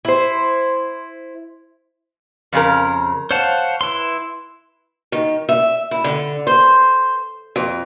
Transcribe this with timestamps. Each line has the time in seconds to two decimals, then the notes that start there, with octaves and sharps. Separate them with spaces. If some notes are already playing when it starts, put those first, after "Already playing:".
0.05 E4 C5
2.53 F2 C#3 A#4
3.31 C5 C#5 F5 F#5 A5
3.81 E4 B4 C6
5.12 D#3
5.49 E5
5.91 E4
6.04 D3
6.47 C5
7.56 F2